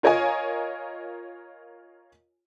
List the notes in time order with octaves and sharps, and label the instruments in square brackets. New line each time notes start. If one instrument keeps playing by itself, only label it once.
[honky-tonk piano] F4 A#4 C#5 D#5 F5 G#5